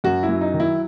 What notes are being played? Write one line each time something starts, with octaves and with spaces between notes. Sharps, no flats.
F#2 F#4
E4
F#3
D#4
D#3
E4